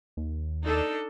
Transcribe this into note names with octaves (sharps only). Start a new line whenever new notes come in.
D#2
D4 D#4 A4